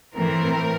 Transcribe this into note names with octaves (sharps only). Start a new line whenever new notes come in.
A2 E3 A3 C4 A#4